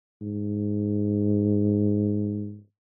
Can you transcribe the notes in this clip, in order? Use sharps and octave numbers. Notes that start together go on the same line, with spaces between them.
G#2